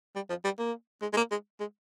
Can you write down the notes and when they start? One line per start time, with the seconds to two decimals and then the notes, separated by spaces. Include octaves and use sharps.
0.15 G3
0.29 F3
0.44 G3
0.58 A#3
1.02 G#3
1.13 G#3
1.17 A#3
1.31 G#3
1.60 G#3